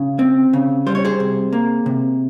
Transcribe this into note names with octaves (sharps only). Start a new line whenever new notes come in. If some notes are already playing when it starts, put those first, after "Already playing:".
Already playing: C#3
C4
C#3
G3 C5
C#5
G#4 C5
C3
A#3
C3